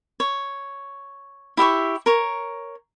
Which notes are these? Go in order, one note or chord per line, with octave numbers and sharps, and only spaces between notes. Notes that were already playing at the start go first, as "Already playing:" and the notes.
C#5
E4 G4 E5 C#6
A#4 C#5